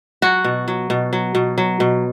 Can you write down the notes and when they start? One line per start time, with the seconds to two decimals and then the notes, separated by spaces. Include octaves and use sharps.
0.22 F#3 F#4
0.44 B2
0.68 F#3
0.90 B2
1.13 F#3
1.35 B2
1.58 F#3
1.80 B2